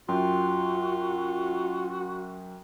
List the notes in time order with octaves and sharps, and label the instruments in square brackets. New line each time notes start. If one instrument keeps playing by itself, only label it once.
[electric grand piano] F#2 [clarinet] F4 [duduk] F#4 [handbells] G5 C6